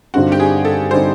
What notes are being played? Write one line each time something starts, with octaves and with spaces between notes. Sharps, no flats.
G2 D3 G3 C4 D#4 F#4
G4
G#4
A4
D3 G3 C4 D#4 C5